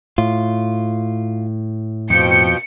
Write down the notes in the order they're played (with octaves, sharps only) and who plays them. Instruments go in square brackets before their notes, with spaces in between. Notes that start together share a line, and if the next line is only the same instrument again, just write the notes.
[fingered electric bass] A2 [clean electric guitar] F4
[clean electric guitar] F2 [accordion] B2 F3 G5 [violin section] C#7